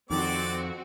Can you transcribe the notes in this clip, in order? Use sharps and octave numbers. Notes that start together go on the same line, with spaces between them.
F2 D#3 C4 F#4 D5 D6